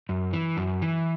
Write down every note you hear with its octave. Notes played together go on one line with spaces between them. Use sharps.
F#2
E3
F#2
E3